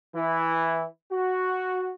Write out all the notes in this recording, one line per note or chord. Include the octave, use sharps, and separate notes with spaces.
E3 E4
F#4